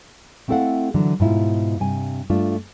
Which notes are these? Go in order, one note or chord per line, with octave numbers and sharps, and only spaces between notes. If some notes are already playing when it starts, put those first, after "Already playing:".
A3 C4 E4 A4 F5 F#5
D3 E3 F#3
G#2 B2 E4 F4
G2 C3 G#5
G2 A3 D4 F4